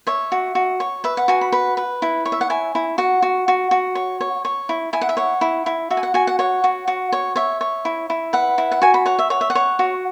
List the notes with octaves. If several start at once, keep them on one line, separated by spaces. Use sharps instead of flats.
C#5 E5
F#4
F#4
C#5
B4 E5
F#5
F#4 G#5
B5
B4 B5
B4
E4
C#5
E5
F#5
E4 G#5
E4
F#4 F#5
F#4
F#4
F#4
C#5
C#5
C#5
E4
E4 G#5
F#5
E5
C#5 F#5
E4
E4
F#4 E5
G#5
F#5
F#4 G#5
F#5
C#5 F#5
F#4
F#4
C#5
C#5 E5
C#5
E4
E4
B4 F#5
E4
F#5
F#4 G#5
B5
C#5 F#5
E5
C#5 F#5
E5
F#5
C#5
F#4